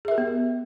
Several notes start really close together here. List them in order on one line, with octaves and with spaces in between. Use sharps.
G#4 E5 A#4 G4 B3